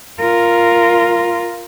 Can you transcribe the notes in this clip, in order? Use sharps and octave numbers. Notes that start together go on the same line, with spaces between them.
F4 A#4